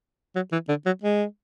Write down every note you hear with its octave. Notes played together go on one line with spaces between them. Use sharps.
F#3
E3
D3
F#3
G#3